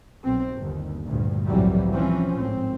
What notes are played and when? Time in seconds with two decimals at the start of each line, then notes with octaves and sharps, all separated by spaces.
0.24 B1 C4
0.56 G1 D#2
1.05 D2 G2 A#2
1.46 C2 F2 A2 E3 F#3 G3
1.92 E3 F3 C4 C#4
2.37 G#1 A2 C4